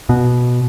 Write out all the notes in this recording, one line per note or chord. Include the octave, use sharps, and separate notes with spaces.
B2